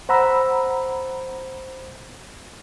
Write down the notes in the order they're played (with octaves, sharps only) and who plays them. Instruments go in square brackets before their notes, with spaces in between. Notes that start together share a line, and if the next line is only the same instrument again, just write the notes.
[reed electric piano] C5 F#5 A#5 B5 E6